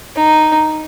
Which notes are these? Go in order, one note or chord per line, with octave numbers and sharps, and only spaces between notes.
D#4